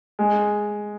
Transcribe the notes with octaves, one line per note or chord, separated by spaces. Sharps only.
G#3